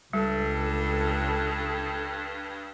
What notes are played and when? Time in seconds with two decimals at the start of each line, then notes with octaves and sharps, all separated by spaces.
0.13 C#2 G2 G3 A4